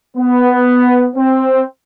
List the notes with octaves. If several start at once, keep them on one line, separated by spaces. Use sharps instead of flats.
B3
C4